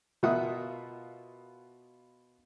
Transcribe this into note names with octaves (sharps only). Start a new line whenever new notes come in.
B2 F4 A#4 E5 F#5 D#6